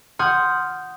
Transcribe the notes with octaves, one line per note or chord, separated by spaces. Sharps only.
F#5 C6 D#6 F6 G6 G#6